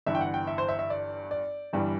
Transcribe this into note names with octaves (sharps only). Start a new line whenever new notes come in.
G1 G2 E3 E5
G5
F#5
G5
E5
C5
E5
E5
D5
D5
G1 G2 E3 G3